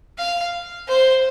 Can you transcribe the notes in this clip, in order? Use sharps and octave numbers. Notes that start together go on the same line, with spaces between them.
F5
C5